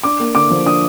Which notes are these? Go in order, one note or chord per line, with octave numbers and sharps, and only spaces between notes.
D4 D6
A#3
D3 D6
F3
D4 D#6